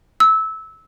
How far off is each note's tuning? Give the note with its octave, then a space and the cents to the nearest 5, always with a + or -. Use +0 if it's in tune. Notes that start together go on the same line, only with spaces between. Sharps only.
E6 -20